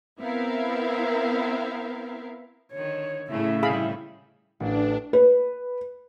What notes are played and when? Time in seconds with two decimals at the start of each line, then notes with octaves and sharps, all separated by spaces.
0.20 B3 C4 E4 A#4 E5 F5
2.72 D3 D#3 C#5
3.30 A2 C#3 A3 C#4 E4 E5
3.63 C3 D#3 G3 G#4 F5 B5
4.60 A1 D4
5.13 B4